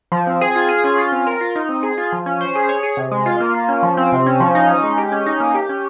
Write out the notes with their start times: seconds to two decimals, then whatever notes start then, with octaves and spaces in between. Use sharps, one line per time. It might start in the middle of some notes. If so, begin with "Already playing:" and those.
0.12 F3
0.27 C4
0.41 G#4
0.56 F4
0.69 G#4
0.84 C#4
0.98 F4
1.12 C4
1.27 A#4
1.41 F4
1.56 D#4
1.69 C4
1.83 G#4
1.98 F4
2.12 F3
2.26 C#4
2.41 C5
2.55 G#4
2.69 C#5
2.83 G#4
2.97 C3
3.11 G#3
3.26 F4
3.40 A#3
3.54 F4
3.69 C#4
3.83 F3
3.97 C4
4.12 C3
4.26 C#4
4.40 F3
4.55 D#4
4.69 C#4
4.83 G#3
4.98 G4
5.12 C#4
5.26 D#4
5.40 A#3
5.54 G4
5.69 C#4